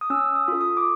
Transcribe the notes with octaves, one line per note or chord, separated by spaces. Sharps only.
D#6
C#4 E6
D#6
F4 A4
D#6
D6